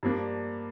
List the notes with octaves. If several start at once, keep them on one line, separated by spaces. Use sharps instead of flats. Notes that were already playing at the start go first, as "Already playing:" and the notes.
G2 F3 A#3 D4